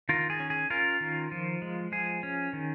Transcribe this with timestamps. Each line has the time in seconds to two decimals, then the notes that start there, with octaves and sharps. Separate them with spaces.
0.09 D#3 F4 A#4
0.30 G#4
0.40 C#4
0.50 G#4
0.70 C#4 F4 A#4
1.01 D#3
1.32 F3
1.62 G#3
1.92 F3 G#4
2.23 C#4
2.53 D#3